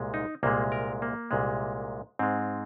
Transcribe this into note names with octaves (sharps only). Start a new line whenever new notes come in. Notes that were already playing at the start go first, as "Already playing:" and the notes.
Already playing: C2 A#2 G#3
D#4
C2 A#2 G#3 A#3
A#4
A#3
C2 A#2 G#3
G#2 G#3 C4